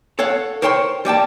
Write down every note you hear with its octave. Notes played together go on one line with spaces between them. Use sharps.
A4 C#5 F5 F#5
A#4 C5 C#5 G5 B5 C6
G3 A#3 G5 A5